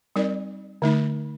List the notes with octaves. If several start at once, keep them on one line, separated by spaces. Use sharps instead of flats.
G3 C4 D#4 A#4 D5
D3 A3 D#4